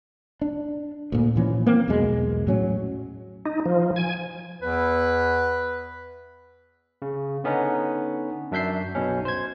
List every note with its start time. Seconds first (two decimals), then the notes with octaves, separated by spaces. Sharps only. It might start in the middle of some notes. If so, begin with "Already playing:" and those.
0.41 D4
1.12 D2 A#2
1.36 A#2 E3 F3 C#4
1.66 A#3 C4
1.88 B1 E2 B2 G#3
2.47 A2 F#3 C#4
3.46 D#4
3.65 F3
3.96 G#5
4.62 E2 B4
7.02 C#3
7.44 D3 B3 C#4 D#4
8.52 F#2 D4 E5 G6 C7
8.95 B1 B2 C#4
9.25 C5 G#6